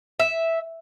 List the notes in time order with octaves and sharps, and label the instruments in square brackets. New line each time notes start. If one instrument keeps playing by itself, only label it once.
[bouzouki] E5